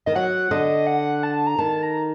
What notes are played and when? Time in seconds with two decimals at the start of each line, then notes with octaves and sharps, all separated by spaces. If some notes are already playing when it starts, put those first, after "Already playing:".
0.06 D#3 D#5
0.16 F#3 F#5
0.51 D3 D#5
0.87 F#5
1.23 A5
1.47 A#5
1.59 D#3 A5
1.83 A#5